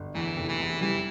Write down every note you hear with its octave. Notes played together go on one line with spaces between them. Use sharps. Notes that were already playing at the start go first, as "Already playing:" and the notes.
Already playing: G1
E2 E3
F1
E3
E2
E3 G3